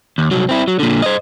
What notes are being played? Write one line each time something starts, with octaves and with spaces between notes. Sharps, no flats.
D#2
C2 F#3
C4 E4
F#3
A#2 D3
C5 D#5